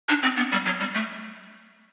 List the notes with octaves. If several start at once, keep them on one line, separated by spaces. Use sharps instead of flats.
D4
C4
B3
G3
F#3
G3
A3